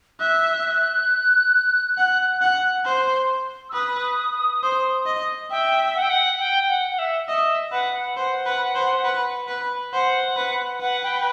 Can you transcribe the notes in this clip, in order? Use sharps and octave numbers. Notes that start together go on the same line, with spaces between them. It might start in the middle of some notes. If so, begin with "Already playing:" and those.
E5 F#6
F#5
F#5
C5
E6
B4 D#6
C5
D#5
E5 G5
F#5
G5
F#5
G5
F#5
F#5
E5
D#5 E5
B4 F#5
C5 F#5
B4
C5
B4
B4
C5 F#5
B4
B4 F#5
G5